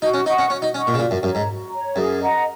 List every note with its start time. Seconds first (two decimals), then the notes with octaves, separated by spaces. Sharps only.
0.02 D#4 F#4
0.14 C#4
0.26 D#4 D#5 F#5 C#6
0.38 C#4
0.50 C#4 F#4
0.62 D#4
0.74 C#4 D#5 F#5 C#6
0.87 A#2
0.94 C#3
0.99 A#2 F#4
1.11 F#2
1.23 F#2 C#5
1.27 A#5
1.35 G#2
1.47 F#4
1.71 C#5 A#5
1.96 F#2 G#4
2.20 D#5 F#5 A#5